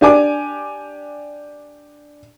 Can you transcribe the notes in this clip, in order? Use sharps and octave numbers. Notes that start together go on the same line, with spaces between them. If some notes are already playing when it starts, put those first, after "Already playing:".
D4 G4 G#5 D6